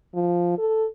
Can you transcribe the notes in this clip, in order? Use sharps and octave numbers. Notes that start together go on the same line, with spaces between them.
F3
A4